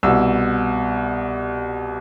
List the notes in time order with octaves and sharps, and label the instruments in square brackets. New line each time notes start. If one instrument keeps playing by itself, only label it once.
[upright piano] C2 B2 E6